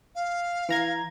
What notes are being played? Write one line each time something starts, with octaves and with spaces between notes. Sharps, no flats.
F5
E3 A#5 G#6